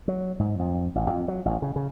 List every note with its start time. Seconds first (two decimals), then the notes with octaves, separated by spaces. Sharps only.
0.08 F#3
0.39 G#2
0.59 F2
0.95 A1
1.10 F2
1.28 F#3
1.46 A1
1.62 C#3
1.76 C#3